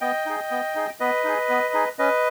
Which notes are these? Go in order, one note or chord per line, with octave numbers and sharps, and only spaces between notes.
B3 D#5 G5
D#4 G#4
B3
D#4 G#4
B3 B4 D#5
D#4 G#4
B3
D#4 G#4
C#4 B4 D#5